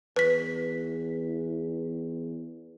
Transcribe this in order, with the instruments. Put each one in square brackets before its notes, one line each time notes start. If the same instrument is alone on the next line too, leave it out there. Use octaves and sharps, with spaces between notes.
[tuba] E2 [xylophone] B4 B6